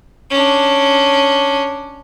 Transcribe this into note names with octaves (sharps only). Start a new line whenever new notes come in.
C#4 D4